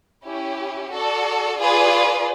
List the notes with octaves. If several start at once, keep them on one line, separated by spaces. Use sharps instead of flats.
C#4 E4 G4
F#4 A4 D5
F4 G#4 B4 D5